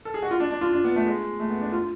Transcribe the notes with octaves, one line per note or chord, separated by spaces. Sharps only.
A4
G#4
F#4
F4
D4
D4
F4
D4
B3
A3
G#3
A3
B3
D4
F4